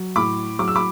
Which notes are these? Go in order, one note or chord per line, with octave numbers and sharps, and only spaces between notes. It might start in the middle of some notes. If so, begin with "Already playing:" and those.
Already playing: F#3
A2 B5 D6
F#3 D6
E6
B5 D6